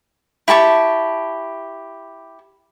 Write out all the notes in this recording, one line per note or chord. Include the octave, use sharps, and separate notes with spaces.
E4 G4 A5 C#6